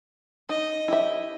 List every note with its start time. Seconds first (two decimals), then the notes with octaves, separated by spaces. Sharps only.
0.49 D#4 D#5
0.88 E4 G4 E5